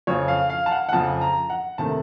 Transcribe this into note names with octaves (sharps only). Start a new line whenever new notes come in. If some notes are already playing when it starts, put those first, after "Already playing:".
F2 C#3 F3 C#5
F5
F5
A5
F#5
F#5
F2 C#3 F3 A5
A#5
F#5
C3 D#3 A3 A5